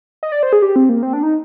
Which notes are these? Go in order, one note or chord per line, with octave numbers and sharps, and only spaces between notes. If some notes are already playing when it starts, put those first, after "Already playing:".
D#5
D5
C5
G#4
G4
C4
A#3
C4
D4
D#4